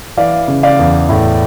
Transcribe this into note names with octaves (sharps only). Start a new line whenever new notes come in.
E3 D5 F5
C#3
D5 F5
E2
A2